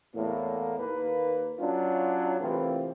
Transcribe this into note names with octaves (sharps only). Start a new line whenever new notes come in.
E2 A2 A#3
D#2 A#3 B4
F#3 C#4 D4 F4
A2 C3 E3 A#3 C4 F4